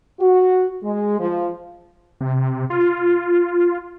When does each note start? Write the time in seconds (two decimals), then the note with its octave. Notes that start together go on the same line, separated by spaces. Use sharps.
0.20 F#4
0.84 G#3
1.19 F3
2.21 C3
2.70 F4